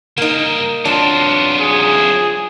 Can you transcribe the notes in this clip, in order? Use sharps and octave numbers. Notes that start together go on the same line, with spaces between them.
C#3 G3 A#3 D#4
F#3 B3 C4 D4 F4
G#4